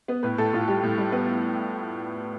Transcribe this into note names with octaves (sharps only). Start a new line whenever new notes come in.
B3
A2 B4
A2 A4
A2 F4
G3 G4
A2
G3
B3